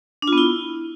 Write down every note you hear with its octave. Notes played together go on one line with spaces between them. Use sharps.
D4
F4
B3
E4